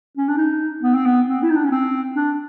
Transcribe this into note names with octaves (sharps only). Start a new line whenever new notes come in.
C#4
D4
D#4
B3
C4
B3
C4
E4
D#4
D4
C#4
C4
D4